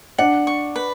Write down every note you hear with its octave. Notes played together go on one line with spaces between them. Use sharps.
D4 F#5
C#6
B4